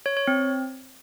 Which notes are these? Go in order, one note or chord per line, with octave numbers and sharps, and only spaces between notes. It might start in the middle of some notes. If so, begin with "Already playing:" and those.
C#5
C#5
C4